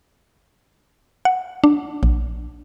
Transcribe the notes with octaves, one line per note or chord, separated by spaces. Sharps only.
F#5
D4
A#1